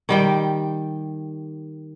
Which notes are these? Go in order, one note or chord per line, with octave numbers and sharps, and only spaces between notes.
D#3 G3 G5